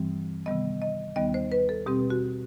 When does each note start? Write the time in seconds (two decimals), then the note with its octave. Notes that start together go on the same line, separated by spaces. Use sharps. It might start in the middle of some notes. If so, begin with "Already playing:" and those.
Already playing: G2 E3 G3 C4
0.46 C3 D#3 G3 B3 D#5
0.82 D#5
1.16 D#2 D#3 G3 B3 D#5
1.34 C5
1.52 B4
1.69 A4
1.86 B2 G3 C4 G4
2.10 F#4